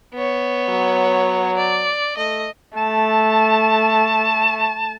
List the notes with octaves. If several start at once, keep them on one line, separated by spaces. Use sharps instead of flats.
B3 C#5
F#3
D5
A3 D#5
A3 A5